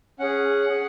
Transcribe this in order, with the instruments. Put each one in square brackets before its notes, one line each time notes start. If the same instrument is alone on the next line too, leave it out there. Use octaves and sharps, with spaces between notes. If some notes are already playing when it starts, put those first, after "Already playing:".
[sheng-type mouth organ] C#4 G#4 F#5
C#4 G#4